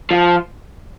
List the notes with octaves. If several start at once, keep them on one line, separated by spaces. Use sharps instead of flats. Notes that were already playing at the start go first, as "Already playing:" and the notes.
F3